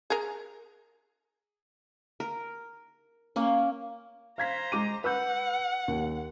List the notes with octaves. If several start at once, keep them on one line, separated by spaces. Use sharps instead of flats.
G#4 A#4
A#4
A#3 C#4
C5 F5 A#5 G#6 B6
G#3 D6 D#7
B4 F#5 E6 G6
D#2